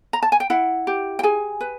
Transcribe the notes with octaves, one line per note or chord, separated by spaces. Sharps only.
A#5
A5
G#5
G5
E4 F#5
G4
G5
G#4 G#5
B4